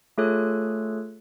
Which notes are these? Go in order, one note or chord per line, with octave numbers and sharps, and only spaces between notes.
A3 F4 G#4 A4 C#5 F#6